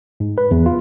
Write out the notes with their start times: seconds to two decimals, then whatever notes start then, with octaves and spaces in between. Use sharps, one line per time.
0.20 G#2
0.38 B4
0.51 E2
0.66 F4